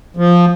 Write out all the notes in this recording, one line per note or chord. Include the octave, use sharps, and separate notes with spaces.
F3